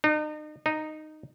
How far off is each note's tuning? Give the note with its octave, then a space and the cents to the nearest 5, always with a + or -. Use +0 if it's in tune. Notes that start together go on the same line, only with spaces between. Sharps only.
D#4 -40
D#4 -10